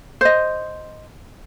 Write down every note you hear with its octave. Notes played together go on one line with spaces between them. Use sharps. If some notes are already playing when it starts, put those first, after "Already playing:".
C5 D#5